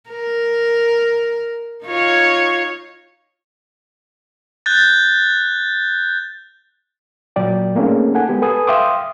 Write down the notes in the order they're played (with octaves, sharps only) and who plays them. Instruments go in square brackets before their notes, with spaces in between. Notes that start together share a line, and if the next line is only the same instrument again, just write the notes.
[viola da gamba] A#4
D#4 F4 C#5
[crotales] F#6 G6 A6
[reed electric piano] A#2 F#3 D5 G5
A3 A#3 C4 C#4 D#4 G#4
A4 F#5 G#5
G#3 B3 G4
A4 B4 G#5 D#6
E5 F5 G5 C6 D6 D#6